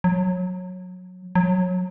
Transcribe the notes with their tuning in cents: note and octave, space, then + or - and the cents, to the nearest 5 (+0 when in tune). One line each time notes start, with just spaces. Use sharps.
F#3 -20
F#3 -20